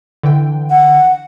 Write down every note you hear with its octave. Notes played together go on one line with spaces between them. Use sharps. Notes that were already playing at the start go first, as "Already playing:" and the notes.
D3 E3 G5
F#5